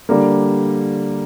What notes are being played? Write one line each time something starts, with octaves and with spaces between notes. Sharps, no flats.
D3 G3 A#3